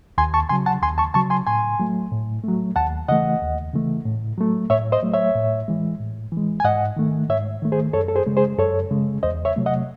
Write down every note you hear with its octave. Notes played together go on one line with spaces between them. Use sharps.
D#2 G#5 C6
A5 C#6
C#3 F#3 G#5 C6
F#5 A5
D#2 G#5 C6
A5 C#6
C#3 F#3 A5 C#6
G#5 C6
A2 G#5 C6
F#3 A3
A2
F#3 A3
D#2 F#5 A5
C#3 E3 A3 D#5 F#5
D#2
C#3 E3 A3
A2
F#3 A3
A2 C#5 E5
C5 D#5
F#3 A3
C#5 E5
A2
E3 G#3
A2
E3 G#3
G#5
G#2 D#5 F#5
D#3 A3
G#2 C#5 E5
D#3 A3
G#4 C5
F#2 A4 C#5
A4
G#4 C5
C#3 G#3
G#4 C5
F#2 A4 C#5
C#3 G#3
E2 C5 D#5
C#5 E5
C3 F#3 A3
D#5 F#5